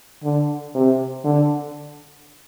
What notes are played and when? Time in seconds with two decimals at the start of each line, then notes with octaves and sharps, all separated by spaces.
0.23 D3
0.75 C3
1.25 D3